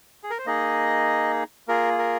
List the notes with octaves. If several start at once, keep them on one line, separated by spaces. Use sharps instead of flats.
G#4
A#4
C5
A#3 D#4 G#4 D#5
A#3 F4 G#4 A#4
A#4